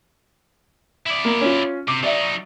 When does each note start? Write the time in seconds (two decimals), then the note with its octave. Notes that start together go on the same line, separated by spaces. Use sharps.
1.06 E4 D5
1.25 A#3
1.41 C#4 F4
1.88 C3 D6
2.03 F#3 D#4 D5 E5